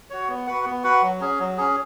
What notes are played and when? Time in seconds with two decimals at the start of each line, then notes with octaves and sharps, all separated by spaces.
0.10 F#4 C#5
0.28 B3
0.47 F#4 B4 F#5
0.65 B3
0.84 F#4 B4 F#5
1.02 F#3
1.21 C#4 G#4
1.39 F#3
1.58 C#4 G#4